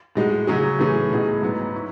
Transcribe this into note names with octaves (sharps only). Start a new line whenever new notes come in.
A2 G#3 D#4 F#4
C#3 F#3 C#4 G#4
A2 E3 A3 C#4 G#4
A2 F#3 B3 D#4 G#4
G#2 F#3 B3
C#4 E4